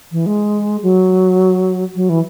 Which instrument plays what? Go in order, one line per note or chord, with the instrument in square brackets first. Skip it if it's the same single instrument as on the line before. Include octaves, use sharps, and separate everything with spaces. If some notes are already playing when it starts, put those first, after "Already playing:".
[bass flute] E3
G#3
F#3
F#3
E3